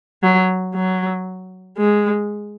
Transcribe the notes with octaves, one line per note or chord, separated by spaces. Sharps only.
F#3
F#3
G#3